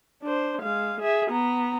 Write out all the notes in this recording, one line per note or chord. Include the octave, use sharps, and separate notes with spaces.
D4 C5
G#3 F5
G#4 E5
B3 A#5